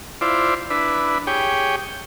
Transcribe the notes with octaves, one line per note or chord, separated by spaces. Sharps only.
E4 F4 C5 D5
D4 E4 B4
G4 G#4 C#5 G5